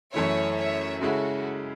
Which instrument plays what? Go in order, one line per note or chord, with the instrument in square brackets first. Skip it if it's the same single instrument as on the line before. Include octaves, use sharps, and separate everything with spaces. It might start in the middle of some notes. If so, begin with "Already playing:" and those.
[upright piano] F#2 E3 A3 E4 [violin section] C#5 E5
[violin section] C#5 E5
[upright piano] C#3 G#3 C#4 E4 [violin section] F#4 A4